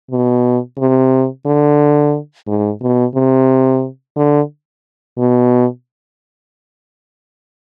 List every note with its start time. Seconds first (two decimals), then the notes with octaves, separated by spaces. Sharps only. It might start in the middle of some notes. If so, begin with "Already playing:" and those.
0.11 B2
0.78 C3
1.46 D3
2.47 G#2
2.81 B2
3.15 C3
4.17 D3
5.18 B2